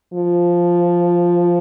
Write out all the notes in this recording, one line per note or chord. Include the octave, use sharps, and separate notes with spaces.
F3